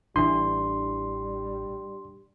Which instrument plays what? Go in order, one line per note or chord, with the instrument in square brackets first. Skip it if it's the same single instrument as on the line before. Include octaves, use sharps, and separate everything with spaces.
[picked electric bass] A1 E3 [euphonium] G3 [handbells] D4 [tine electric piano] C6